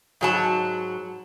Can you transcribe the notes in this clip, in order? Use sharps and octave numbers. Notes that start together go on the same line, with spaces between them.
G#2 F#3 A5